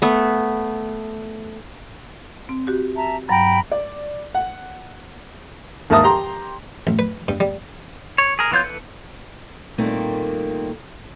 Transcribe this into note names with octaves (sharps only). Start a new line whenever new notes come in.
A3 B3
C4
F#4 G4
E5 A5 A#5
G2 F#3 G5 A#5 B5
D5
F#5
D#2 G#2 A#4 E5 A5 D#6
G4 A#5 C6
A1
B4
G2
G3
C#5
G#4 A#4
E3 B3 F4 C#5 G6
E3 A4 B4
A#2 D#3 G3 A3 A#3 C4